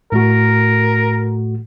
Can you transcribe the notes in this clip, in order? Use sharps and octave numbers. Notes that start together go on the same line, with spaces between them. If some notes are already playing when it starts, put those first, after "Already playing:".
A2 A3 F#4 A#4